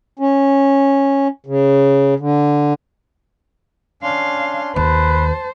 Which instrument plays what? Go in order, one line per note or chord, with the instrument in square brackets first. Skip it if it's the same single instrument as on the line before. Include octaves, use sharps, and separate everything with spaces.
[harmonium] C#4
C#3
D3
[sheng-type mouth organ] C#4 D4 C6 [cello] F5
[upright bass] D#2 [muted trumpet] B4 [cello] C5 [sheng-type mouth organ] A5